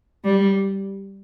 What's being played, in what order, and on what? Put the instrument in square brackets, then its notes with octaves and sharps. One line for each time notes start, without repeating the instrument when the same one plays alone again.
[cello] G3